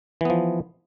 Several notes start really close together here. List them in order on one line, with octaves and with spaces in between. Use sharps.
E3 B3 F3